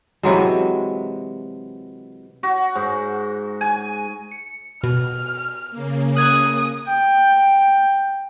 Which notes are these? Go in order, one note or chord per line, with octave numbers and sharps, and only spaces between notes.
C3 E3 F#3 G#3
F#4
G#2
G#5
C#7
B2 F6
C#3 A#3
D#6 F#6 G#6
G5